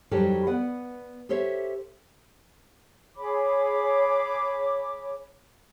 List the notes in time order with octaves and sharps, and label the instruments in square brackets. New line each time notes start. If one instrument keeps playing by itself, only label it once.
[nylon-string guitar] F2 D#3 F#3 G3 G4 A4
B3 B4 D5 F#5
G4 A4 C5 C#5 E5
[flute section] G#4 C#5 B5 D6